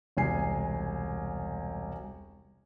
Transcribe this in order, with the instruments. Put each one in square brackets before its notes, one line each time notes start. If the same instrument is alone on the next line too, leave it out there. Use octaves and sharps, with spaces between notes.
[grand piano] E1 C2 G#5 C7